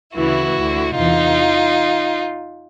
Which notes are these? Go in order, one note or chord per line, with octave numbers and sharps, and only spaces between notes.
D2 C#3 E3 E4 F#4
D2 D3
E2 C3 E3 D#4 F4